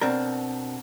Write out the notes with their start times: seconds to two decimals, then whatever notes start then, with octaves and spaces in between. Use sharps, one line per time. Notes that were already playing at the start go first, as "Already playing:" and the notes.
0.01 B2 C4 D4 A#4